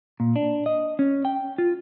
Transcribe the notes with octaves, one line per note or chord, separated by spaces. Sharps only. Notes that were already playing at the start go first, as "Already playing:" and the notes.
A#2
D4
D#5
C#4
G5
F4